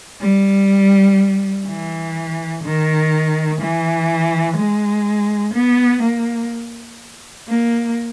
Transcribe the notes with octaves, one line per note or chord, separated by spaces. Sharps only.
G3
E3
D#3
E3
G#3
B3
A#3
A#3